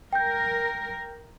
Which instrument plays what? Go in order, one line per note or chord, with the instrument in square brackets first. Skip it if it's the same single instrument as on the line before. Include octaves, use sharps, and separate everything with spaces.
[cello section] A#4 [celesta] G5 G6